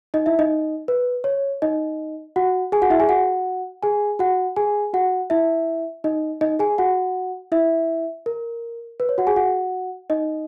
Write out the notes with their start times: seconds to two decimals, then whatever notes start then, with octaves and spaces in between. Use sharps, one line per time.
0.14 D#4 D#5
0.26 E4 E5
0.39 D#4 D#5
0.88 B4
1.24 C#5
1.62 D#4 D#5
2.36 F#4 F#5
2.72 G#4 G#5
2.82 F#4 F#5
2.90 E4 E5
3.00 G#4 G#5
3.09 F#4 F#5
3.83 G#4 G#5
4.19 F#4 F#5
4.56 G#4 G#5
4.94 F#4 F#5
5.30 E4 E5
6.04 D#4 D#5
6.41 D#4 D#5
6.59 G#4 G#5
6.78 F#4 F#5
7.52 E4 E5
8.26 A#4
9.00 B4
9.09 C#5
9.18 F#4 F#5
9.27 G#4 G#5
9.36 F#4 F#5
10.10 D#4 D#5